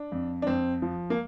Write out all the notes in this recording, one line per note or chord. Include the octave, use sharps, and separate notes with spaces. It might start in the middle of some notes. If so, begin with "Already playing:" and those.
Already playing: D4
F2
D4
F2 C4
F3
A#3